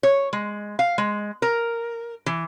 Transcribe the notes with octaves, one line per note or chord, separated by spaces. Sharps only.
C#5
G#3
F5
G#3
A#4
E3